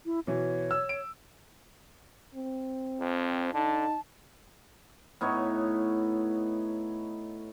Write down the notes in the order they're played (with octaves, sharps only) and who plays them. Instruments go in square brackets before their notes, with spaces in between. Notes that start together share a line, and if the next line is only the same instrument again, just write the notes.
[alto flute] E4
[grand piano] B2 E3 [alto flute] C#5
[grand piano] E6
D7
[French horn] C4
[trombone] F2
[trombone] D3 [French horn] D#4 [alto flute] A5
[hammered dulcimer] A2 B3 D#4 C#5